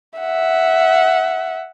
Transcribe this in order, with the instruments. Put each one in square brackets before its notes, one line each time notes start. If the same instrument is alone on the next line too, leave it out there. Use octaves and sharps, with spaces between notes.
[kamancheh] E5 F#5